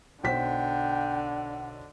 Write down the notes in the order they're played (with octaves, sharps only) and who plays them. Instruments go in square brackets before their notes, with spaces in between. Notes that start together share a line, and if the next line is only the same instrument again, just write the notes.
[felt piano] B1 C5 B6 [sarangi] D3 [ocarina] F#5 [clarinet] G5